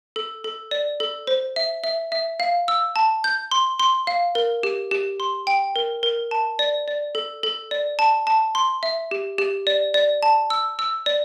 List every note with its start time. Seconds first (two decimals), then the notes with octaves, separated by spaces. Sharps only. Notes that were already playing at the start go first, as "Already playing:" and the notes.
0.16 A4
0.44 A4
0.71 D5
1.00 A4
1.27 C5
1.56 E5
1.84 E5
2.12 E5
2.40 F5
2.68 E6
2.96 A5
3.24 G6
3.51 C6
3.80 C6
4.07 F5
4.35 A#4
4.63 G4
4.91 G4
5.20 C6
5.47 G5
5.76 A#4
6.03 A#4
6.31 A5
6.59 D5
6.88 D5
7.15 A4
7.43 A4
7.71 D5
7.99 A5
8.27 A5
8.55 C6
8.83 E5
9.11 G4
9.38 G4
9.67 D5
9.94 D5
10.23 A5
10.50 E6
10.79 E6
11.06 D5